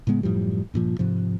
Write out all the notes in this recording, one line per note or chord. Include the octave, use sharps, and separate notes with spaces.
A2 C#3 G#3 B3
F#2 A2 F3 G3
G2 A#2 F3
G#2 C3 F3